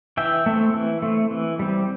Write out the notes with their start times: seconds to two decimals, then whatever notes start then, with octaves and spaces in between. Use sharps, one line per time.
0.17 E3 E5 G5
0.46 A3 C4
0.74 E3
1.02 A3 C4
1.31 E3
1.59 G3 C4